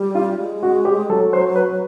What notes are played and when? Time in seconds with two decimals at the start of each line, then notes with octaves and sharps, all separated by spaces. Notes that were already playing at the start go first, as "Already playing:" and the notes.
Already playing: G3
0.15 F4
0.39 G#3
0.62 F#4
0.85 G4
1.09 F#3 A4
1.33 C5
1.56 B4